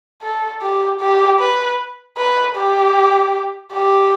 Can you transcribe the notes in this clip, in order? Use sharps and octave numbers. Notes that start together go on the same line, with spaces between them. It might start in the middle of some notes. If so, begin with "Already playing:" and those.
A4
G4
G4
B4
B4
G4
G4